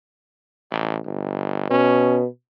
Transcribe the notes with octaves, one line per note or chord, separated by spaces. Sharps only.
A1
G1
B2 C#4